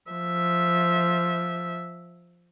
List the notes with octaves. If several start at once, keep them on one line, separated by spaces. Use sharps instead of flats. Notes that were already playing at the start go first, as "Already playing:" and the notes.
F3 E5